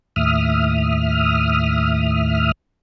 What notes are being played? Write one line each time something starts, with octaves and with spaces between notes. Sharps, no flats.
D#2 A2 E5 D#6 F6